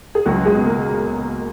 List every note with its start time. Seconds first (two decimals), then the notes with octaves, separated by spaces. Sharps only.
0.15 G#4
0.26 C#2 F#3 F#4
0.45 G#3 G#4
0.56 B2
0.66 A#3 A#4